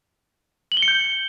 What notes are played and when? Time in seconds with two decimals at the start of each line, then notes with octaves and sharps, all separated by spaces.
0.72 F#7
0.77 G7
0.82 C#7
0.88 G6